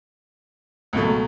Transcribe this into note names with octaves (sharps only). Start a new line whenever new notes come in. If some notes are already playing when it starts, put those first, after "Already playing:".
C#2 B2 F#3 A3